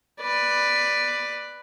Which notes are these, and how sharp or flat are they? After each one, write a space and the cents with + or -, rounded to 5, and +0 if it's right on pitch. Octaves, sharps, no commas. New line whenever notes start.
B4 +0 D5 +10